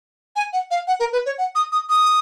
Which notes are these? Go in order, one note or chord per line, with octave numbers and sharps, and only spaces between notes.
G#5
F#5
F5
F#5
A#4
B4
C#5
F#5
D#6
D#6
D#6